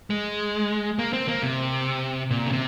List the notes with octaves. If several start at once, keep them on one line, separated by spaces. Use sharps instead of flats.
G#3
A#3
C4
A#3
C3
A#2
C#3
C3